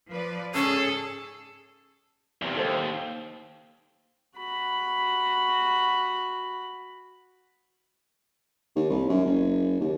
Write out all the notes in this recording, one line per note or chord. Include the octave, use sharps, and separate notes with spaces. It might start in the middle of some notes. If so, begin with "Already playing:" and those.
F3 B4 D5
G#2 C#3 C#4 G#4 A4
E2 C3
D#2 A4 C5
F#4 B5
D#2
C2
F#2
F#1
D#2